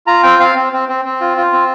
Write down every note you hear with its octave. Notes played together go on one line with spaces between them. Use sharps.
F4 A#5
C4 G5
C4 F5
C4
C4
C4
C4
F4
F4
C4